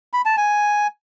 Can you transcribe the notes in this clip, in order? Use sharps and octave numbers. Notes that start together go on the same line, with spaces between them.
B5
A5
G#5